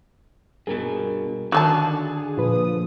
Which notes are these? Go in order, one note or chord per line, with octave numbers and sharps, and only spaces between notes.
G2 B2 G#4 A#4
D3 D#3 F#3 G4 A5 F#6
G#4
A#2 F3 F4 B4 D#6